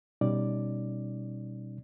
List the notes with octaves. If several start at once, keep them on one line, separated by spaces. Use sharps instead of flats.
B2 G3 C#4 D#4 D5